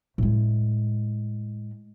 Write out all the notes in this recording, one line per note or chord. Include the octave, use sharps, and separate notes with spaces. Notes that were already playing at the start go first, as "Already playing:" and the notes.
A2 G#3